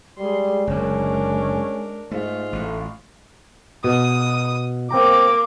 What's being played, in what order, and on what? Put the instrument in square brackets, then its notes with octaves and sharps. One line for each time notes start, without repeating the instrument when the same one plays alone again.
[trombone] G3 [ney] G#3 [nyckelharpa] G#4 C6
[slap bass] F#1 D2 [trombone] C#4 [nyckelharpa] D4 A#4
[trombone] G#2 [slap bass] A3 [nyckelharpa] F4
[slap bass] A1 [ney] A3
[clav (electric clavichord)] B2 [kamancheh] D#6
[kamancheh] A#3 D6 [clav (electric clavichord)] C4 G5 A#5